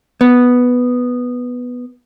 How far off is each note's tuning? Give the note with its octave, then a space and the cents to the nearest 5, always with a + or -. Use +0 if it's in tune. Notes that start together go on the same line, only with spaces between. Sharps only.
B3 +0